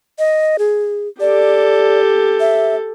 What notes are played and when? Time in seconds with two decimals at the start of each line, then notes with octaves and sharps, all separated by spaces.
0.19 D#5
0.59 G#4
1.20 G4 A4 D5
2.40 E5